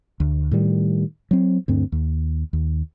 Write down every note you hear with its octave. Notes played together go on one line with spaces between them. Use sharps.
D2
A2 D#3 G3
F#3 C4
D2 G2 C4
D#2
D#2